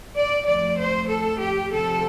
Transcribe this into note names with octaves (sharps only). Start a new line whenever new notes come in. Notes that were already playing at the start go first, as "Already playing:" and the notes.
D5
F2 F3 A3 D5
C5
A4
G4
C3 F3 C4 A4